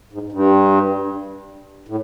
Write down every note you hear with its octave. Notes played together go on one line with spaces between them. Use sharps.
G#2
G2
A2